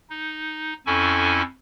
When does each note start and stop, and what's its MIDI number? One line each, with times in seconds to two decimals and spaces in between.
0.10 0.74 63
0.86 1.42 41
0.86 1.42 61
0.86 1.42 64
0.86 1.42 69
0.86 1.42 80
0.86 1.42 85